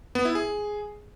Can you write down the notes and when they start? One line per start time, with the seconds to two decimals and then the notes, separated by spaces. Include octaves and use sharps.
0.15 B3
0.25 E4
0.35 G#4